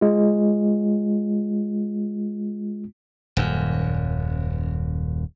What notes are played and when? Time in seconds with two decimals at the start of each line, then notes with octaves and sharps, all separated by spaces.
0.01 G#3 F4
3.37 D#1 F#2